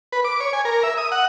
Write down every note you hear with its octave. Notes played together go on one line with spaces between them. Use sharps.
B4
D6
C#5
G#5
A#4
E5
D#6
F#5